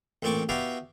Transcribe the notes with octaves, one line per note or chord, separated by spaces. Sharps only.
A1 A#2 C4 D5 C#6 D6
B3 E4 F#4 G4 D5 F5